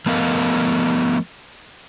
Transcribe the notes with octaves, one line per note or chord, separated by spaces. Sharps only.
F3 A3 B3 A#4 D#5 F5